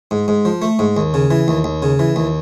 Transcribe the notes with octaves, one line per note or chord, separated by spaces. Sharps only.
G#2
G#2
F3
A3
G#2
D#2
C#3
E3
D#2
D#2
C#3
E3
D#2